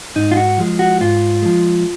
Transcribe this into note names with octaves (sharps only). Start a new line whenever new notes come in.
G#2 D#4
F4
F#4
F3 G#3
F#4
G#2 F4
F3 G#3